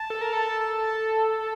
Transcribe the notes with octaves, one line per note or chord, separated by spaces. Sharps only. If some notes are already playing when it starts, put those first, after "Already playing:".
Already playing: A5
A4
A#4
A4